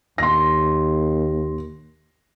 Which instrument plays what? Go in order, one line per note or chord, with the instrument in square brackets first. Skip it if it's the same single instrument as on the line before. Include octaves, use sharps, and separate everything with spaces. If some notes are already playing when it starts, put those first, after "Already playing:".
[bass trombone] D#2 [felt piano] C6 A#6